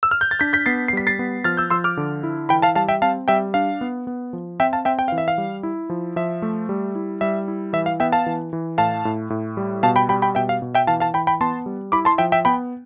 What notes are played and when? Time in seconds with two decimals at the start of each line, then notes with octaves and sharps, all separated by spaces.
0.03 E6
0.11 F6
0.21 G6
0.31 A6
0.39 D4 G6 B6
0.53 G6 B6
0.66 B3 A6 C7
0.88 C7
0.93 G3 B6
1.07 A6 C7
1.19 B3
1.44 F3 F6 A6
1.57 E6 G6
1.70 F3 C6 E6
1.84 D6 F6
1.97 D3
2.23 E4
2.49 E3 G5 B5
2.62 F5 A5
2.75 G3 F5 A5
2.88 E5 G5
3.02 C4 F5 A5
3.28 G3 E5 G5
3.54 D4 F5
3.81 B3
4.07 B3
4.33 F3
4.60 C4 E5 G5
4.73 F5 A5
4.85 C4 E5 G5
4.99 G5
5.08 E3 F5
5.18 E5
5.28 F5
5.38 G3
5.63 E4
5.90 F3
6.16 F3 E5
6.42 A3
6.69 G3
6.95 E4
7.21 G3 E5
7.48 E4
7.73 E3 E5
7.86 F5
8.00 B3 E5 G5
8.12 F5 A5
8.26 E3
8.53 E3
8.78 A2 F5 A5
9.05 A2
9.30 A2
9.57 G3
9.83 B2 F5 A5
9.96 G5 B5
10.09 G3 G5 B5
10.22 G5 B5
10.35 B2 E5 G5
10.49 F5
10.62 B2
10.75 E5 G5
10.87 E3 F5 A5
11.00 F5 A5
11.14 E3 G5 B5
11.27 G5 B5
11.41 B3 A5 C6
11.66 G3
11.92 E4 B5 D6
12.05 A5 C6
12.18 F3 E5 G5
12.32 E5 G5
12.45 B3 G5 B5